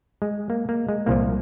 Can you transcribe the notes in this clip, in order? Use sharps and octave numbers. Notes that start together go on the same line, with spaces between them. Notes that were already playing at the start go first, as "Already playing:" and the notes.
G#3
A#3
A#3
G#3
C2 A#2 F3 A#3